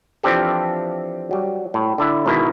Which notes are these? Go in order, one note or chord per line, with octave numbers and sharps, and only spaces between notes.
E3 F3 C4 D4 G4 A4
F#3 G3
A2
D3 D4 E4
G#2 B2 D#3 E4 D#5